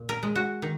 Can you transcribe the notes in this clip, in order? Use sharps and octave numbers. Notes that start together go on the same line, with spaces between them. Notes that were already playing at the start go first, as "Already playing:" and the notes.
Already playing: A#2
A#4
G#3
F#4
D#3